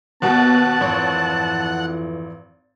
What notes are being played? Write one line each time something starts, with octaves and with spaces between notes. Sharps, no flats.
D#2 B2 B3 F#4 F#5 A5
G#1 F2 E3 C#5